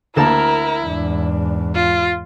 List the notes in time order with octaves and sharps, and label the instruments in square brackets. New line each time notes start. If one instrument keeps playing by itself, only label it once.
[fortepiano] D2 A#3 A5 [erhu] E4 [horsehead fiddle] A#4
[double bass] E2 G#2 [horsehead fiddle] D4
[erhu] F4